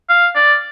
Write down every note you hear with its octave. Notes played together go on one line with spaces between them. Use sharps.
F5
D5